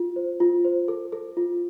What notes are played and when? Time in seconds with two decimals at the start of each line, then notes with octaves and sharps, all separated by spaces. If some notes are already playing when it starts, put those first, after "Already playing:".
Already playing: F4
0.16 C5
0.40 F4
0.65 C5
0.88 A4
1.12 A4
1.37 F4